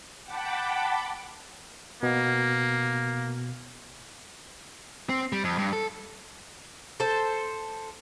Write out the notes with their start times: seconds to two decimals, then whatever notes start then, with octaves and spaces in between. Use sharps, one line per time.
0.24 F#5 G5 A5 B5 D6
2.03 B2 A#3 B3
5.09 C4
5.33 G3
5.44 F2
5.58 G2
5.73 A4
7.00 A4 C5